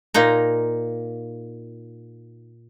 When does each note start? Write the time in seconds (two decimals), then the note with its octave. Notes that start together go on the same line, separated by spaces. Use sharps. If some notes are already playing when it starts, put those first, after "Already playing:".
0.14 A#2 A#3 D#4 A#5